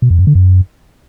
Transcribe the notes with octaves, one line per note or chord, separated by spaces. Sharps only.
B2
F2
F#2
D3
F#2